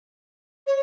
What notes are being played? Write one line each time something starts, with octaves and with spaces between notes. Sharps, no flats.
C#5